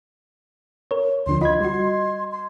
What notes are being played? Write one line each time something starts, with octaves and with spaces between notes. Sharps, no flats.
A#4 C#5
D2 D3 F3 C6
F4 D#5 B5 G#6
G3 F#4 C6
C6